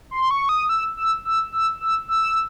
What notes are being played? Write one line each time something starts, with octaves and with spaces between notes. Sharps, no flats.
C6
C#6
D#6
E6
E6
E6
E6
E6
E6